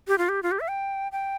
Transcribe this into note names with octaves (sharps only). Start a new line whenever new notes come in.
G4
F4
G4
F4
G4
E5
G5
G5